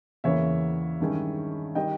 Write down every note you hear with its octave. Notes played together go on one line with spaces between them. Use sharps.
E2 C#3 E3 A#3 C#5 E5
G2 D#3 G#3 C#4
D#3 G3 D#5 G5